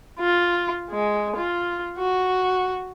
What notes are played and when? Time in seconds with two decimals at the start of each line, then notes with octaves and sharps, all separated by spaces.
0.19 F4
0.91 G#3
1.36 F4
1.98 F#4